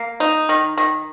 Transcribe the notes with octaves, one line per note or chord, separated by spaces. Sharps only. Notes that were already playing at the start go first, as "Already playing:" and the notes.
Already playing: A#3
D#4
D#3
D#3